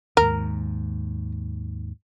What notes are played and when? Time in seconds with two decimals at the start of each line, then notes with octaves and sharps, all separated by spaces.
0.17 D#2 G#2 A#4